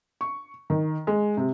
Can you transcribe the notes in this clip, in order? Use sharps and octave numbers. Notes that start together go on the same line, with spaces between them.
C#6
D#3
G#3
C3